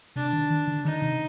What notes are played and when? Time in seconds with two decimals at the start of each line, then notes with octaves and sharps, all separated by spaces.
0.16 C3 D4
0.33 D#3
0.50 D#3
0.68 D3
0.85 D#3 D#4
1.02 C3